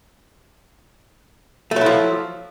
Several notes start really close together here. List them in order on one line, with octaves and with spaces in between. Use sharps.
A3 F#3 E4 F3